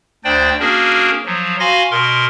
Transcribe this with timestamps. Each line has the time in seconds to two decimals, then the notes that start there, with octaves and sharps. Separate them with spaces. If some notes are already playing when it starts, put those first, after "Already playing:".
0.24 D2 D4 C5 D5 G5
0.60 A#3 C#4 D4 F#4 G#4 A#4
1.26 F3 F#3
1.60 F#4 F5 G#5 B5 C6 A#6
1.91 B2 A#4 C6